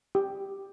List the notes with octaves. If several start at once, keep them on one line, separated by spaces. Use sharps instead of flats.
G4